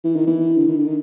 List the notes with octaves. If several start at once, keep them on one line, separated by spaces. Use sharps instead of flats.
E3
D#3
E3
D3
D#3
D3
D#3